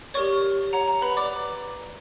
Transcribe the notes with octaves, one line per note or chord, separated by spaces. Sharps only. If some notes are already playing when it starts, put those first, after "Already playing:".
G4 A#4 C#5 D5 C#6
C#5 F#5 A#5
A#5
B4 B5
D5 D6